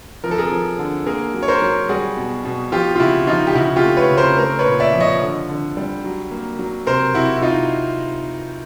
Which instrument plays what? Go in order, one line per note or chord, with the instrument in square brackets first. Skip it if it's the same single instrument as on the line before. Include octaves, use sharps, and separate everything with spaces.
[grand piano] F3 A#4
A4
G#4 A#4
F3
D3
A#3 G#4 A#4
F#3
C#5
A#4 C5
F#3
G3 F#4 G#4
B2
B2
F3 F4 G4
F4
C#3 E4 F#4
F3 D#4 F4
G4
C#3 E4 F#4
F4 G4
A3
B4 C#5
C#3
A#4 C5
A3 A#4 C5
B4 C#5
A#2
D5 E5
F3
C#5 D#5
D3
D3
G3
F#3
A#3
F#3
C3 A#4 C5
C3 E4 F#4
E4
C3 D#4 F4